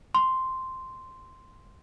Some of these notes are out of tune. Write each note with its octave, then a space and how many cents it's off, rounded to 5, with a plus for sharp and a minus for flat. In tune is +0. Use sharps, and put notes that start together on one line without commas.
C6 -5